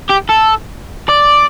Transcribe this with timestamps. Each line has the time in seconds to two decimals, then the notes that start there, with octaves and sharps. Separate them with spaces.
0.10 G4
0.30 A4
1.10 D5